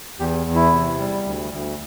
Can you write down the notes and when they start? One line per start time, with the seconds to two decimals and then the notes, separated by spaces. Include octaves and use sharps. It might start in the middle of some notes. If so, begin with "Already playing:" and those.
0.19 E2 G4
0.46 E2
0.55 E4
0.73 C3
0.99 G3
1.25 D2
1.52 D2